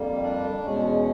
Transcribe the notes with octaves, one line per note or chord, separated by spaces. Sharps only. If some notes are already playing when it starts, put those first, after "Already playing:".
Already playing: F2 D3 G3 A#3
D4
E2 B2 G#3 C#4